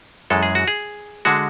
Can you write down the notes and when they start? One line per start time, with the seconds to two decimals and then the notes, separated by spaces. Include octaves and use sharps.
0.30 F#2 E3 G#3 A4
0.43 G#4
0.55 F#4
0.68 G#4
1.25 D3 G#3 F#4